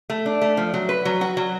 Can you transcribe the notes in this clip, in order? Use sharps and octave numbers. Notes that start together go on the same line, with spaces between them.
A3
D4
A3
F3
F#3
B4
F#3
F#4
F#3